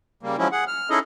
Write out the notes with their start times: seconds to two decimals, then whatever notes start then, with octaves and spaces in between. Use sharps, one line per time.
0.23 C#3 G3 A#3
0.38 F3 F#3 G#3 C#4 E4
0.52 G#4 F#5
0.68 F6
0.90 C#4 D#4 E4 G#4 A4 D#5